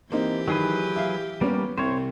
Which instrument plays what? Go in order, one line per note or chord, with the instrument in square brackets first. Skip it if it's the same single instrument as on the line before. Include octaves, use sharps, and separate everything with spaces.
[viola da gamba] E3 G4 [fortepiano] A#3 C4 D#4
[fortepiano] D#3 [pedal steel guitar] F#3 G#4 B4
[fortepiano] E5 F5
[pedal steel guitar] G3 A#3 [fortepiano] B3 C#4
[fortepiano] C2 [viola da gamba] C3 [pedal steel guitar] C5 C#5